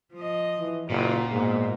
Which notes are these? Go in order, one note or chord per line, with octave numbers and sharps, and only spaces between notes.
F3 D#5
E3
F#1 A#2 F4
G#2 B2 A#3